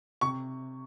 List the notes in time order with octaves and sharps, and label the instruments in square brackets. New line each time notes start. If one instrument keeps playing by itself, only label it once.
[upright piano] C3 C#6